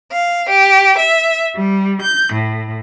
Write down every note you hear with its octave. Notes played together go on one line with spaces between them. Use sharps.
F5
G4
E5
G3
G6
A2